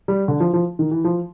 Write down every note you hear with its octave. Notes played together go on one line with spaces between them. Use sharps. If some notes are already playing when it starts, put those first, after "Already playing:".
G3
D3
F3
F3
D#3
E3
F3